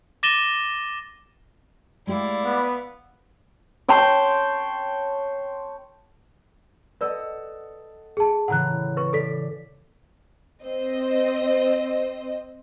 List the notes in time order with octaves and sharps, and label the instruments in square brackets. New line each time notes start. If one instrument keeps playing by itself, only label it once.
[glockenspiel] D6 A6 A#6 D#7 E7 G7
[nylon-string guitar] G#3 A3 G4 [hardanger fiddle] E4 F5 [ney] D5
[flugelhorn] B3
[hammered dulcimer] C#5 G5 A5 C6
[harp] A4 D#5 F#5 [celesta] B4 D5 E6
[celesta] G#4 A5
[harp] A2 C#3 E3 [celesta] F#5 A#5 F#6
[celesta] B4 C#6
[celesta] A4 B6 [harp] D5
[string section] C4 C5 D#5